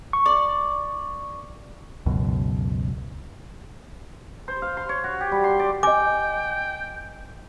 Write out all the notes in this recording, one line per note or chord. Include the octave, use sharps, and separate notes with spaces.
C#6
D5
C#2 F#2 B2
C5
F5
C6
C#5
F#4
G4
G3
C6
D5
D#5 G5 G#5 D6